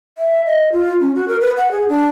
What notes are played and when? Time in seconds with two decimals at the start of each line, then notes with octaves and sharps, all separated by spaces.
0.18 E5
0.46 D#5
0.72 F4
1.00 C#4
1.15 F#4
1.28 A#4
1.41 B4
1.57 F#5
1.71 G#4
1.89 D4